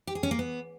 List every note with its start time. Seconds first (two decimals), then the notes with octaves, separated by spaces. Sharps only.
0.07 G4
0.15 G#4
0.23 C#4
0.31 A#3
0.39 B3